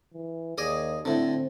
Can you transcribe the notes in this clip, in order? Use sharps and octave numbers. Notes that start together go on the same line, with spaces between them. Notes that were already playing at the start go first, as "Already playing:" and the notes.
E3
D#2 G#4 D5 D#5
A2 D3 C4